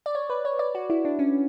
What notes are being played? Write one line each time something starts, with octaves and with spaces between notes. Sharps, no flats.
D5
C#5
B4
C#5
D5
F#4
E4
D4
C#4